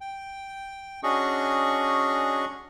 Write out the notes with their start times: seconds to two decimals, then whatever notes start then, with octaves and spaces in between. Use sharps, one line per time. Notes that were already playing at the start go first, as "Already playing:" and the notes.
0.01 G5
1.03 C#4 D4 F#4 G#4 D#5 C#6